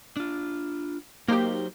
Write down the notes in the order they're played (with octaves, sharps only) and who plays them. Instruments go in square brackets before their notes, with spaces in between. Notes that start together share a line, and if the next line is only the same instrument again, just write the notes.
[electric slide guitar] D4 F4
[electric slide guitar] F#3 C5 [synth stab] A#3 D#4 G4